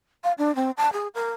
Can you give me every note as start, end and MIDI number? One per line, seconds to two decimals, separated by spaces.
0.24 0.32 77
0.38 0.54 62
0.55 0.71 60
0.77 0.92 81
0.93 1.08 68
1.14 1.32 70